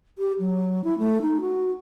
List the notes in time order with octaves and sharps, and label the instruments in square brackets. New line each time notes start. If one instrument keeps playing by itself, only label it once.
[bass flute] G4
F#3
E4
A3
D#4
F#4